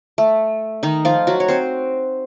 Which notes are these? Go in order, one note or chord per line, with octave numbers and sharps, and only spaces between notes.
A3
D#3 D#4
F3 F4
F#3 F#4
C#5
C4 C5